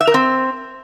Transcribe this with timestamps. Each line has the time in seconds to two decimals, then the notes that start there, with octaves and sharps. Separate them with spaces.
0.01 E5
0.07 A#4
0.14 C4